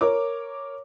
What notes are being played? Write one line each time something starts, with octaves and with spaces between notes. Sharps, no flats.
A#4 C#5 D6